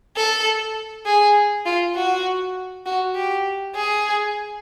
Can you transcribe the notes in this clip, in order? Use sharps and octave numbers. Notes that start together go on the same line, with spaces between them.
A4
G#4
F4
F#4
F#4
G4
G#4